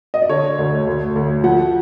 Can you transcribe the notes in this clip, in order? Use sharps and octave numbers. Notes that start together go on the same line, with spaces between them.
D#5
D5
D3 C#5
D2
D2
D2
F3 F#5